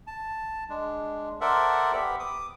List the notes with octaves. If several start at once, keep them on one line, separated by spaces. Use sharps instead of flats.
A5
G#3 D4
A4 A#4 C5 D5 E5 F#5
B3 G4 B5
D6 D#6